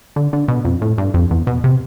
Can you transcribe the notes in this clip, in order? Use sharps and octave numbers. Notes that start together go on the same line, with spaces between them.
D3
D3
B2
F2
A2
G2
F2
E2
B2
C3